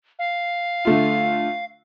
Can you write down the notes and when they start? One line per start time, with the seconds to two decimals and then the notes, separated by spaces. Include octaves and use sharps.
0.19 F5
0.85 D3 A3 F4